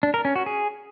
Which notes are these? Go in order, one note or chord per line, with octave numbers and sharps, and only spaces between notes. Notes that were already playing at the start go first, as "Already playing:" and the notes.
D4
A#4
C#4
F#4
G#4